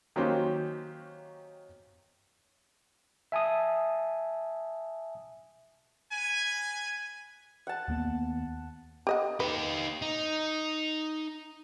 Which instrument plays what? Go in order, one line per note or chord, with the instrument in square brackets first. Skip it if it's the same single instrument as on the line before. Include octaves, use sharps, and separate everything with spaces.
[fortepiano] D#3 F#3 A#3 C#4 G4 C5
[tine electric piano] E5 G#5 A5 D#6
[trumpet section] B4 G#5
[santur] F#5 A5
[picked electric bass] D#2 A#3 B3
[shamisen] G4 D#5 F#5
[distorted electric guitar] D#4 G4 [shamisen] B4
[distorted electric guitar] D#4